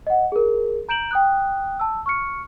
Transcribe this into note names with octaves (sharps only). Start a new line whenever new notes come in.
D#5 F#5
G#4 A#4
A#5 G6 D7 E7 F#7
G5 D#6 F#6
A5 E6
C#6 F6 C#7